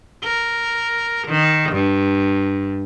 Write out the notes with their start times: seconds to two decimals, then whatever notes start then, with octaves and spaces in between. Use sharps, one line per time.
0.24 A#4
1.27 D#3
1.72 G2